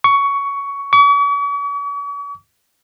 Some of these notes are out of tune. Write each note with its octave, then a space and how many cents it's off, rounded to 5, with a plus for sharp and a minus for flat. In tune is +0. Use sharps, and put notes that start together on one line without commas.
C#6 +15
C#6 +45